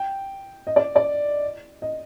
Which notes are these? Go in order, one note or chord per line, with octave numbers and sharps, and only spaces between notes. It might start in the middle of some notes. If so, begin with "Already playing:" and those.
Already playing: G5
D#5
D5
D5
D#5